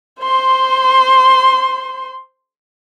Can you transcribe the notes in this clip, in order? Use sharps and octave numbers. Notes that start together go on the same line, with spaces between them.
C5 C6